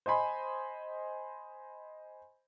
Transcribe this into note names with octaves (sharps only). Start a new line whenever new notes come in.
C5 D#5 G#5 B5 C6